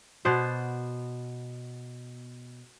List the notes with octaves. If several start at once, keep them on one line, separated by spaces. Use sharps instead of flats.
B2 B3 C5 D5